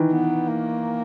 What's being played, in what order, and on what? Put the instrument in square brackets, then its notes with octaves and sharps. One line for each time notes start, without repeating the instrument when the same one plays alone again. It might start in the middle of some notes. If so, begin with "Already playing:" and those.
Already playing: [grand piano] D#3 E3
[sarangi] B3
A#3